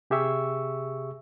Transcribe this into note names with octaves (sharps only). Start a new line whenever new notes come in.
C3 G4 G#4 E5 C#6 E6